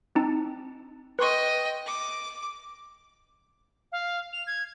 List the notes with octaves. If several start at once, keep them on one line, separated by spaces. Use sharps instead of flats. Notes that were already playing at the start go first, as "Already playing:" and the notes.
C4 D#4 A5
B4 D#5 G5 C6 C#6
D6
F5
F7
G#6